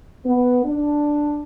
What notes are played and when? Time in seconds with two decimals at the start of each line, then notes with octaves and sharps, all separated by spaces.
0.25 B3
0.65 D4